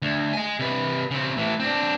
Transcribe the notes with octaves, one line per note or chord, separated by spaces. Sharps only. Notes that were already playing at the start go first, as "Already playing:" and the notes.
D2
D#5 G#5
C3 B4
C#3 C4
A2 E3
C4 D4